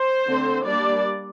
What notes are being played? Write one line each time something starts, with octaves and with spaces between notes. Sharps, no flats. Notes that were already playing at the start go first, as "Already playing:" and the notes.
Already playing: C5
D3 A3 C4
G3 A#3 D4 D5